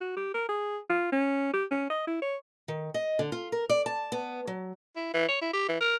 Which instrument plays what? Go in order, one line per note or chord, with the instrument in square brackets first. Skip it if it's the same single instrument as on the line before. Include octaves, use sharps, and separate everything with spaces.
[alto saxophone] F#4
G4
A#4
G#4
F4
C#4
G4
C#4
D#5
E4
C#5
[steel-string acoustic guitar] D#3
D#5
D3
F4
A#4
D5
A5
B3
F#3
[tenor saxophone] E4
E3
C#5
E4
G4
E3
A#4